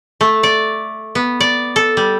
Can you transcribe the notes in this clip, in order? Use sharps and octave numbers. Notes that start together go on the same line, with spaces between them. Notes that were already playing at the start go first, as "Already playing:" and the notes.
A3
D5
B3
D5
A4
G3